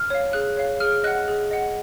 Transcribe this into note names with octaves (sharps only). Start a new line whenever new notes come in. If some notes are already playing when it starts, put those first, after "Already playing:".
Already playing: F6
C#5 F5
G#4 F#6
C#5 F5
G#4 F6
D#5 F#5 F#6
G#4
D#5 F#5